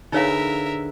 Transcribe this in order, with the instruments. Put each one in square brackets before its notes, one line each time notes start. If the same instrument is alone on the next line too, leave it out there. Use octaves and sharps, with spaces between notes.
[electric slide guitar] D3 G#4 B4 [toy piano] D#4 C#5 F5 [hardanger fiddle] A#4 E5